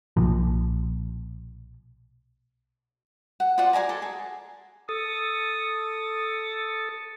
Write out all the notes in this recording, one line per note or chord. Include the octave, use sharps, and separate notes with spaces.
B1 A#2 F3
F#5
F4 C5 D5 F#5
G#4 D5 G#5 A#5
A4
G#4
A4 D#6